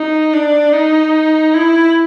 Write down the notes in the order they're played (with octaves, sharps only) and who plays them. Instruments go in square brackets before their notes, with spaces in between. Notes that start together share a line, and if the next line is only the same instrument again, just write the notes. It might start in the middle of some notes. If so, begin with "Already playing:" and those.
Already playing: [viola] D#4
D4
D#4
E4